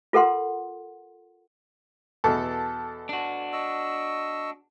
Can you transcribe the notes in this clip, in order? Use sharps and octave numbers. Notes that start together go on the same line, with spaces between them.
F4 A4 A#4 F#5 C6
E2 B2 E3 A4
D4 F#4
D#5 C#6 E6